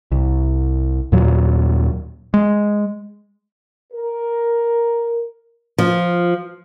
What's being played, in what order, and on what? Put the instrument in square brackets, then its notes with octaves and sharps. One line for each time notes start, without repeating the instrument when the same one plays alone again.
[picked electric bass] C2
D#2 A#2 F#3
G#3
[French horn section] A#4
[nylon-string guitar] F3